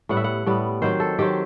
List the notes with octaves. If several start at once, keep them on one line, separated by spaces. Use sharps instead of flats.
A2 G3 B3 F#5
E5
F#5
A2 G3 B3
D#3 F#3 C4 C5
A4
D#3 F#3 C4 G4